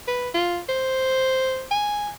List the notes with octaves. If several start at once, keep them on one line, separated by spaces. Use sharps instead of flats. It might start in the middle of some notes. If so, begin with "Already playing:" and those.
B4
F4
C5
G#5